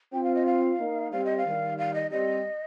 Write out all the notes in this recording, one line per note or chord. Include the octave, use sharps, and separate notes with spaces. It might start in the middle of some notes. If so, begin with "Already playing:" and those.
C4 F4 G5
F5
D#5
F5
A#3 D#4
G3 C4 F5
D#5
F5
D#3 G3
F5
D#5
G3 C4 D#5